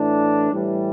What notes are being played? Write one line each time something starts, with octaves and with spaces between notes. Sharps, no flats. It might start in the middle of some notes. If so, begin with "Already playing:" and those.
Already playing: A2 E3 A3 D4
A2 E3 G3